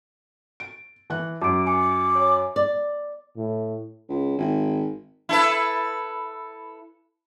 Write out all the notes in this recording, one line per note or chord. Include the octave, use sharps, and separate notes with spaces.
D7
E3 F#6
F#2 D6 D7
G#5 D6 C#7
C#5 G#5
D5
A2
C#2
G#1
E4 A4 B4